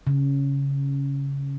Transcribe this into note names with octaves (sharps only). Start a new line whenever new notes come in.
C#3